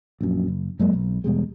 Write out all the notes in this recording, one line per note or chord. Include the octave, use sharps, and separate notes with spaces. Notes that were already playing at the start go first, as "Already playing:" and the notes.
A#1 F#2
F#1
G2 F#3 G#3 A#3
B1
E2 B2 G3 G#3